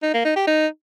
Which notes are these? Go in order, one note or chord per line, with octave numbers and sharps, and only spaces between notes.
D#4
A#3
D#4
G4
D#4